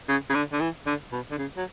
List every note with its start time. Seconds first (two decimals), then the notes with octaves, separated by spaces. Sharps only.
0.09 C#3
0.30 C#3
0.34 D3
0.53 D3
0.61 E3
0.86 D3
1.12 B2
1.31 D3
1.38 C#3
1.57 F#3